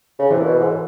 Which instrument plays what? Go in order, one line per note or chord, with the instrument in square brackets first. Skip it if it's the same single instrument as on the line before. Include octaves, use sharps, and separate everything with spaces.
[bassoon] C#3
[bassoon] C3 [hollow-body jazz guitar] E3
[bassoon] A#2
B2
G#2
A2